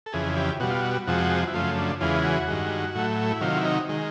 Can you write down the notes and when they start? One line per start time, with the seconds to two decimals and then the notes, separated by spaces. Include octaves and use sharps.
0.06 A4
0.12 F2 C#3 E3 G#4
0.37 G4
0.60 B2 G3 F#4
0.70 F4
0.79 F#4
1.07 F2 C3 F3 G#3 F#4
1.48 E4
1.54 F#2 C#3 F3 A3 F4
1.78 D4
2.01 E2 C#3 E3 G#3 F4
2.24 F#4
2.48 G2 D#3 G#3
2.95 A2 F#3 A3
3.31 E4
3.41 C3 D#3 F#3 F4
3.57 E4
3.65 D#4
3.89 D#3 G#3